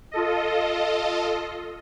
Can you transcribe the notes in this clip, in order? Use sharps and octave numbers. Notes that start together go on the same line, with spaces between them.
F4 A4 D#5